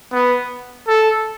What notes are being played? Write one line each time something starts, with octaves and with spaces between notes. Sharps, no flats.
B3
A4